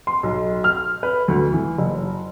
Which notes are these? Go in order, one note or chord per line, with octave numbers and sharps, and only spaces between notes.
C6
B1
F6
B4
D2
E3
F#1